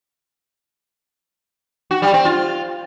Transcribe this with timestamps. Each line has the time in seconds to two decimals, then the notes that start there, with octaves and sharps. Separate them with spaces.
1.91 F#4
2.02 G3
2.14 C4
2.25 F4